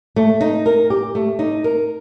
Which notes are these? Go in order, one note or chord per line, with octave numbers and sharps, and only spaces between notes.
A3
D#4
A#4
G4
A3
D#4
A#4